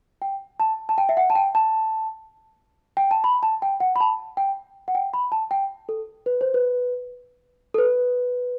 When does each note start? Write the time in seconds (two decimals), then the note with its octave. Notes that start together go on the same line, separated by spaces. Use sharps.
0.22 G5
0.60 A5
0.89 A5
0.98 G5
1.09 E5
1.17 F#5
1.30 A5
1.35 G5
1.55 A5
2.97 G5
3.11 A5
3.24 B5
3.43 A5
3.62 G5
3.80 F#5
3.96 B5
4.00 A5
4.37 G5
4.88 F#5
4.95 G5
5.13 B5
5.32 A5
5.51 G5
5.89 A4
6.26 B4
6.41 C5
6.54 B4
7.74 A4
7.78 B4